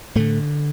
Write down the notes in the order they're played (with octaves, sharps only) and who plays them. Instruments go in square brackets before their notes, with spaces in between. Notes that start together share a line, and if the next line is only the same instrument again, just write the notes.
[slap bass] A2 D3 A3